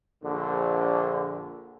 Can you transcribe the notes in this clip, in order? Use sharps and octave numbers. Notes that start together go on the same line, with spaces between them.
A#1 D3